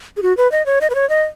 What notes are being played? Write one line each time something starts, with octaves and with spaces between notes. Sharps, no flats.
G#4
F#4
B4
D#5
C#5
D#5
B4
C#5
D#5